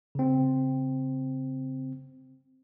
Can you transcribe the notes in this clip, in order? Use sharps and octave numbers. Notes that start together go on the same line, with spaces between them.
C#3 C4